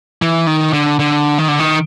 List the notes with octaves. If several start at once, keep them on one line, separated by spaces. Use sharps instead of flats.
E3
D#3
D3
D3
D#3
D3
D#3